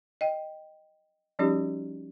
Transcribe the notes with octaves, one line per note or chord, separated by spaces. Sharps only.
D#5 G5
F3 G3 C#4 D#4 F#4 G4